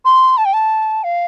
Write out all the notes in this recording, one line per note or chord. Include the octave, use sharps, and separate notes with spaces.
C6
A5
G5
A5
F5